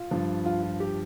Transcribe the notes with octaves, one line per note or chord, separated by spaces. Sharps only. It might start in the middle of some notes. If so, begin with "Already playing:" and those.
Already playing: F4
G2 F3
F4
F4
G4